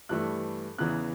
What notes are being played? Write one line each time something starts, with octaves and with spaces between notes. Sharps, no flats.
G2 E3 A3 F#6
E2 C#3 E3 F#6